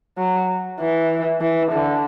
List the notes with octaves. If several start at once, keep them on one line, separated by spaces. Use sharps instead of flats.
F#3
E3
E3
D3